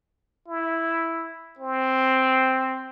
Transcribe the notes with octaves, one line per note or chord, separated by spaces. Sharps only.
E4
C4